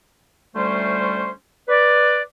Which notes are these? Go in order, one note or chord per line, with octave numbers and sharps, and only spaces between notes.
D2 G3 A3 C#4 C5
B4 D5